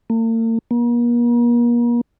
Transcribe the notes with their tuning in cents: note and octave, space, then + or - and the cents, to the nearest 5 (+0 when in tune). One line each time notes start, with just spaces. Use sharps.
A#3 -45
A#3 +40